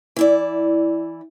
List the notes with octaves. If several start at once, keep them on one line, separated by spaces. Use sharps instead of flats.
E3 E4 D5